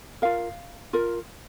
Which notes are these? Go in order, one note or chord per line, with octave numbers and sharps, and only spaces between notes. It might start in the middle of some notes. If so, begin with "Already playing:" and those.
F4 A#4 F5
F4 A#4